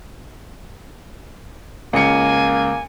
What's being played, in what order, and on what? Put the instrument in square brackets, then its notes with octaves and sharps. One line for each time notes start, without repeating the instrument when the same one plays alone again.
[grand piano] C#2 C#7 [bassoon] A#3 [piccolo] G#5